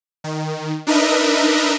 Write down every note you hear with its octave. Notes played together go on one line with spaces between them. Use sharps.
D#3
D4 D#4 A#4 B4 D#5 E5